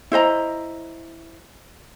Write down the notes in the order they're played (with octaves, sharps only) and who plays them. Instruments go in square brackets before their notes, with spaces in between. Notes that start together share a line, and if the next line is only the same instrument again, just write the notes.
[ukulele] E4 C5 D#5 A#5